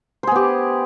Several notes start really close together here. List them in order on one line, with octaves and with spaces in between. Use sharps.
C5 G#4 B3 G4